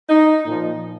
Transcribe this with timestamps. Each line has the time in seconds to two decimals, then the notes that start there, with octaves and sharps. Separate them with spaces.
0.09 D#4
0.46 A#2 F3